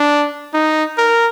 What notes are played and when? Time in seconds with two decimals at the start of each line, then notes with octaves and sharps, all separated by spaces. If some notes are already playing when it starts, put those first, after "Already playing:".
Already playing: D4
0.54 D#4
0.98 A#4